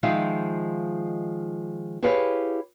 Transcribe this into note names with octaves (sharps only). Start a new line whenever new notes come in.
D#3 F3 G#3 D#4 E5 F5
E4 G4 G#4 B4 C#5 F5